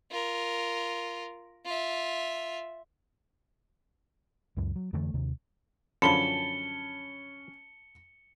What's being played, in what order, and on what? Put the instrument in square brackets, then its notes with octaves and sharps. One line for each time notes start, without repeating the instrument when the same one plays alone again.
[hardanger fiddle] F4 A#4
F4 E5
[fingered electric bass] C#2 F#2
F#3
F2 D3 E3 A3
D#2 C3 D#3
[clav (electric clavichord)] F#2 D3 F3 [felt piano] C#4 [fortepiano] A5 B5 [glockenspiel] C#7 G7